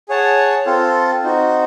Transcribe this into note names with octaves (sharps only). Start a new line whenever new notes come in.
G#4 C#5 F#5 A5
C4 F4 A4
C4 D#4 F#4